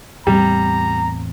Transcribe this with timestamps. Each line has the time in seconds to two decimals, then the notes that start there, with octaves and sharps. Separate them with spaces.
0.27 E2 A2 G3 C4 A#5